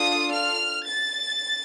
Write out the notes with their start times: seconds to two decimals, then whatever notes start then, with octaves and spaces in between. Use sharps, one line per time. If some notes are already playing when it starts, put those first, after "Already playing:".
Already playing: D4 F4 A4 D#6
0.32 F6
0.87 A6